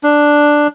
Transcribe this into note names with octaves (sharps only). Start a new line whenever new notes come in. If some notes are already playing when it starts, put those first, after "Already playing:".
D4